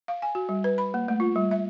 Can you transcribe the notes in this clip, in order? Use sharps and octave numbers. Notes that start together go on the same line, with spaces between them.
F5
G#5
F#4
G3
B4
B5
A#3
A3
F4
G3
E5